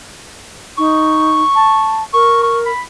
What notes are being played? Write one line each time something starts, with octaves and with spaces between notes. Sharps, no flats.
D#4 C#6
A5
A#4 C#6
C#6
B5